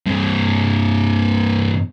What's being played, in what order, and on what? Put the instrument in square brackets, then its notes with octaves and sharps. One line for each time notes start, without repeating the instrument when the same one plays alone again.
[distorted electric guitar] G2 C3